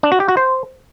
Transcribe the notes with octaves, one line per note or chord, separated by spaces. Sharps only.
D4
F#4
G4
F#4
C5